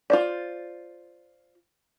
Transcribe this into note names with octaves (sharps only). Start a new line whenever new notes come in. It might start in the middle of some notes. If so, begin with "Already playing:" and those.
F4 C5 D5